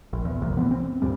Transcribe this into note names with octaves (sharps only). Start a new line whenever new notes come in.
A#1
E2
C2 F2 A#2
E3 F#3 B3
C4
C#2 G2 A#2 G3